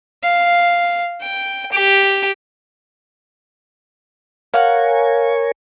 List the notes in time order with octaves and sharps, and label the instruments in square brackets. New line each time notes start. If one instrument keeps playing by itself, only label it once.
[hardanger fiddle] F5
G5
G4
[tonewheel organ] A#4 C#5 G#5 [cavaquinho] F5 F#5